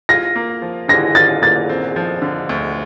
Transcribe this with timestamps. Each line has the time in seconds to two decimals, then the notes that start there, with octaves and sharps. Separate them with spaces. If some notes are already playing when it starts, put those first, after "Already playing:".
0.09 F4 A#6
0.36 A#3
0.62 F3
0.88 D3 A#6
1.15 F4 A6
1.42 A#3 A6
1.69 C4
1.96 F3
2.22 D3
2.49 D2